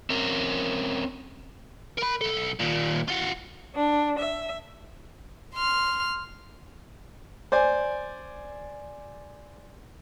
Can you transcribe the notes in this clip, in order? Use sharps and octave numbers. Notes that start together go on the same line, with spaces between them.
C4 C#4 A#4
A#4 B5
B1 A4
D#2 A#2
F4 F#4
D4
E5
C6 F6
C5 D5 G#5